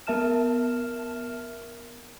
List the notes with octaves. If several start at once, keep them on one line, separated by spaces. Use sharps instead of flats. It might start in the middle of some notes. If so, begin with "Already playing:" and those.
B3 A#4 E5 A5 F6 E7